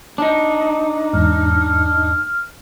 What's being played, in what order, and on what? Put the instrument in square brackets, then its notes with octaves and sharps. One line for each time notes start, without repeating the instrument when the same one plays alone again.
[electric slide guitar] D4 D#4
[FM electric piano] E2 G#2 [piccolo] F6